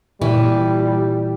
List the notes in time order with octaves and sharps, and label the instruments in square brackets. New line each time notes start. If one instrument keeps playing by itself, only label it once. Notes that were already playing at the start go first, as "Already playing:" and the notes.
[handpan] A#2 G4 [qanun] E3 [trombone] G3